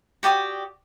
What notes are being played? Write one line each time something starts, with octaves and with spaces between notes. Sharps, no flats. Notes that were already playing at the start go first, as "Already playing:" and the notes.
F#4 G4 D5 D#6